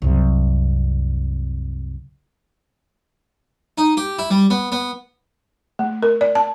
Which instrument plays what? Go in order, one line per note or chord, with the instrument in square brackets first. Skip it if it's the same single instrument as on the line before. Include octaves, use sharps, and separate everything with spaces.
[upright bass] C2 F#2
[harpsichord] D#4
G4
E4
G3
B3
B3
[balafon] A3
A#4
D5
A5